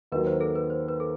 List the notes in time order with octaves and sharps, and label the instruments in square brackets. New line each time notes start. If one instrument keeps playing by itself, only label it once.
[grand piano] D#2 D#3 F#3 [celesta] B4
[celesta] C5
A4
B4
C5
B4
A4